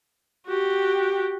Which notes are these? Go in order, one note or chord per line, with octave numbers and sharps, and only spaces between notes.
F#4 G4